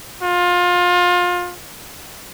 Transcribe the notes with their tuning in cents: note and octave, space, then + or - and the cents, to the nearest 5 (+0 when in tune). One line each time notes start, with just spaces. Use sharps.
F4 +25